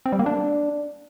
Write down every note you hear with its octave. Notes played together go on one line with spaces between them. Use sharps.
C4
G3
A#3
D4